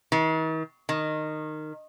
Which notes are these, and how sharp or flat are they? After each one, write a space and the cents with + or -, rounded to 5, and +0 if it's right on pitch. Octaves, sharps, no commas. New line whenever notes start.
D#3 +45
D#3 -15